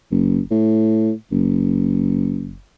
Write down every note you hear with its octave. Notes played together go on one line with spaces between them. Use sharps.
F#1
A2
F#1